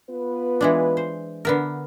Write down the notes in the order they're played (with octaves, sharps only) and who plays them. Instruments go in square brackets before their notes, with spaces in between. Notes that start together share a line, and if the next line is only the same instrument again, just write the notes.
[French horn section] B3 F4 B4
[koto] E3 G#3 D4
C5
D3 B3 A#4